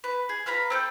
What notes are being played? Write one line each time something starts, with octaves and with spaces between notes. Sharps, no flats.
B4
G#4
F4 B4 A#5 B5
C4 A4 G5